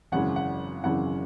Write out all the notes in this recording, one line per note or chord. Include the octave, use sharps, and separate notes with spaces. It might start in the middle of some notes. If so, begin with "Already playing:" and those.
G#1 F#2 C#3 E3 G#3 F#5
F#5
G#1 F#2 C#3 E3 G#3 F#5